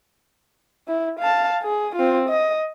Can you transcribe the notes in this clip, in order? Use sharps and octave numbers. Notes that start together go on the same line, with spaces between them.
E4
F5 A5
G#4
C4 F4
D#5